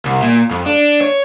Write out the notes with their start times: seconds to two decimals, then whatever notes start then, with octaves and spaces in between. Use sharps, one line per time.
0.05 C2
0.22 A#2
0.51 F2
0.66 D4
1.01 C#5